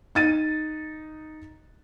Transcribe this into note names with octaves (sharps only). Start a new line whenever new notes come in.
D#4 A6 D#7